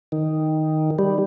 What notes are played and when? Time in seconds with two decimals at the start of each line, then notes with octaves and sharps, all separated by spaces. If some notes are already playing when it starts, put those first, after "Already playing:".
0.12 D#3
0.99 G3